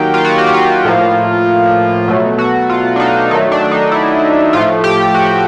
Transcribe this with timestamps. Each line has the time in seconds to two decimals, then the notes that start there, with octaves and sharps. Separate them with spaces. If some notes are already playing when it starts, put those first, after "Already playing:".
Already playing: D#3 F#3 A#3 G4
0.14 F4
0.25 F#4
0.38 G4
0.47 F#4
0.54 F4
0.85 A2 F3 A#3
2.08 B2 F#3 A3
2.38 F#4
2.70 F4
2.96 D4
3.00 D#4
3.31 D#3 F#3 A3 D#4
3.52 D4
3.71 D#4
3.92 E4
4.53 A2 F3 A3 F4
4.84 G4
5.14 F#4